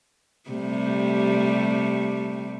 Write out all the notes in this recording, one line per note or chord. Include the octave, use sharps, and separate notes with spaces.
C3 G3 A3